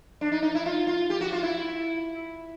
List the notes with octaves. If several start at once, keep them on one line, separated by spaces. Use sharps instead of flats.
D4
D#4
D#4
E4
F4
F4
G4
F#4
F4
E4